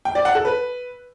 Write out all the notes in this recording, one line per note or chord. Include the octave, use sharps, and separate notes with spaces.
G5
D5
F#5
A4
B4